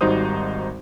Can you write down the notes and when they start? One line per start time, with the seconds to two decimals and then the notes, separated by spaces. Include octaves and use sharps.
0.01 G#1 G3 D#4 F#4 C5 D#6